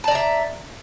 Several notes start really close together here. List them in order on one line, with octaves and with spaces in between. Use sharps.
A5 D5 A#5 E5